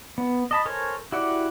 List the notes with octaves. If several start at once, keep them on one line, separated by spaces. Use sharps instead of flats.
B3
D#5 A5 B5
A4 A#4 C5 C#5 G#5
E4 F#4 G4 D5 F#5